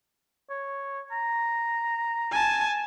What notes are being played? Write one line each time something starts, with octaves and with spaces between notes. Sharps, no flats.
C#5
A#5
G#5 A5